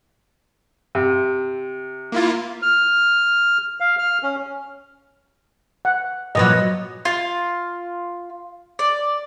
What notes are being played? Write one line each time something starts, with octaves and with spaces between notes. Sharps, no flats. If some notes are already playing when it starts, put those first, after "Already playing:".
C3
A#3 E4 F4
F6
F5
F6
C#4
F#5
A#2 F3 F#3 B4 D#5
F4
D5